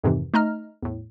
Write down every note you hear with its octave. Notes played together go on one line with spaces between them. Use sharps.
F2 G#2 C3 D#3 E3
A3 D#4 D#5 A#5 F6
E2 A2